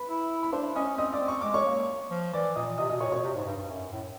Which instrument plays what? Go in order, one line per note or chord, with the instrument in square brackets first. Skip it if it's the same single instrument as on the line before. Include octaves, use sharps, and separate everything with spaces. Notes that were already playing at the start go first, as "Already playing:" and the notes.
Already playing: [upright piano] B4 B5
[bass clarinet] E4
[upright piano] B5
[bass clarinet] D4 [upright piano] C5 C6
[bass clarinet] C#4 [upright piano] D#5 D#6
[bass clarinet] C4 [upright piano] D#5 D#6
[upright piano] D5 D6
[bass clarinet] C4
[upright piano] C#6
[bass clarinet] G#3 [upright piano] D6
[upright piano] C#5 C#6
[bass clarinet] A#3
F3
[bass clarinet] E3 [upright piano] D5 D6
[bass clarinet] A#2 [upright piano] D#5 D#6
[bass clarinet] C3 [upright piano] D#5 D#6
[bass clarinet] B2 [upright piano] D#5 D#6
[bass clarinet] A#2 [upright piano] C#5 C#6
[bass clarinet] B2 [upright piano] C#5 C#6
[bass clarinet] C3
G#2
G2
G2
F#2
A2